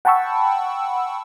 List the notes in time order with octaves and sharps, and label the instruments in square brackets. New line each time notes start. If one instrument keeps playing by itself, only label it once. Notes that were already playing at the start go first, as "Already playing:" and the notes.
[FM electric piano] F#5 G5 A5 B5 C#6 E6